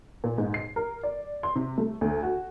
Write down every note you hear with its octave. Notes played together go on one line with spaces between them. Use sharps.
A#2
G#2
C7
A#4
D5
C6
C3
A3
D2
F#4